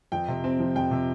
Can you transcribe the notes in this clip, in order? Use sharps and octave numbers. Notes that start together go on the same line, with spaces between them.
F2 G5
C3
C4
F3
F2 G5
C3